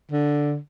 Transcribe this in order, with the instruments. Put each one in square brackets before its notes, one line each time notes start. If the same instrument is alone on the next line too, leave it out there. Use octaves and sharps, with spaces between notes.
[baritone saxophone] D3